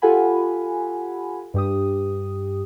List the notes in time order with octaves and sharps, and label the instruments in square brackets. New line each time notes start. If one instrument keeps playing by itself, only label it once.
[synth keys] F4 G4 A4 F#5 G#5 B5
G2 G4 D#6